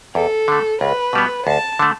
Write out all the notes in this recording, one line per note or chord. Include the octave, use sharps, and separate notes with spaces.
E2 A4
D3 A3
C#2 B4
B2 G3 B3
D2 A5
D3 A3